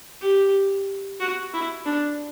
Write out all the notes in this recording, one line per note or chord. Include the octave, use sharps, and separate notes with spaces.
G4
F#4
E4
D4